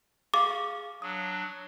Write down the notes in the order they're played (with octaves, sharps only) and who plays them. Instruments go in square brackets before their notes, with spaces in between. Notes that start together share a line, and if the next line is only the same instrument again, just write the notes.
[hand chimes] G#4 F5 C#6 [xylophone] D6
[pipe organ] F#3 D4 [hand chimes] D#6